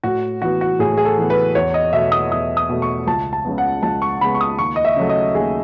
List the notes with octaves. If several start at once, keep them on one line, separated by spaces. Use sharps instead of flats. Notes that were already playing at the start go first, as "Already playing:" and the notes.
A2 F#4
E3 B3 F#4
F#4
A2 G#4
G#4
A4
E3 B3
B4
E2 C#5
D#5
B2 A3 E5
D#6
E2 D#6
D#6
B2 A3
C#6
C#2 A5
A5
C#3 G#3 B3
F#5
C#2 A5
C#6
C#3 G#3 B3 B5
C#6
D#6
D#2 C#6
D#5
E5
C#3 F#3 A3
D#5
D#2 G#4